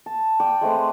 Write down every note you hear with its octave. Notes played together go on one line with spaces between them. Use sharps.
A5
D5 G5
G#3 A3 C4 B4